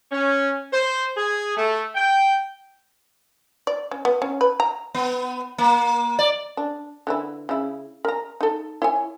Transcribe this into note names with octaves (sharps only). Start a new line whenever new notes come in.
C#4
C5
G#4
A3
G5
D5
C#4
B3
C#4
B4
A#5
B3
A#3
D5
D4
D3 E3 E4
C#3 E4
A#4 A#5
D#4 A4
E4 C#5 G#5